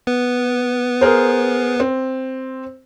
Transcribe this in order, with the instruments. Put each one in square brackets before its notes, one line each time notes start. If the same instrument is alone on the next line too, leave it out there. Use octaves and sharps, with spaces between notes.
[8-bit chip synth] B3 B4
[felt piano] G#4 A#4 C5
C4